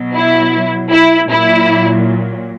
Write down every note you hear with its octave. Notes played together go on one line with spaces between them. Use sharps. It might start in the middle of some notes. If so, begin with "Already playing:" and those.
Already playing: B2 F#3
E4
E4
A#2 F#3 E4